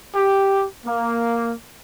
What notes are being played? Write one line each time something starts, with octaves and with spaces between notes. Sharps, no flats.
G4
A#3